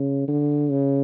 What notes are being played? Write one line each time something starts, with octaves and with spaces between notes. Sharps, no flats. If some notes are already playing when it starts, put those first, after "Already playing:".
Already playing: C#3
D3
C#3